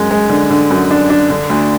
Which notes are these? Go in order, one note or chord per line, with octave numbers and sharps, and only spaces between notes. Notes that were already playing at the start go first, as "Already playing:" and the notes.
Already playing: F#2 G#3
G#3
D3
D3
F#2
D4
D4
D3
D2